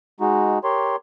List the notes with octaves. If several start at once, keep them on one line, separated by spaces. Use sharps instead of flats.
G#3 D#4 F#4
G4 A#4 C#5 C6